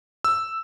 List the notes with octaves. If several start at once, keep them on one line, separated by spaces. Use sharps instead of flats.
E6